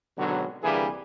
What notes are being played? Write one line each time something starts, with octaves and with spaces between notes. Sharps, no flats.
G#1 B2 D3 F#3
C2 D3 E3 G3 A#3 G#4